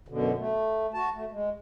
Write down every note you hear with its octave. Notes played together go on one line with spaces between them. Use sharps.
F#2 B2 D3
A3
F#4 A5
A3
G#3